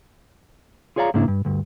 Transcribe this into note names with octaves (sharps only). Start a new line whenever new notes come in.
F4 G#4 C#5 D5 F5 A#5
G#2 C#3 A#3 D4 E4
G2
D2 G2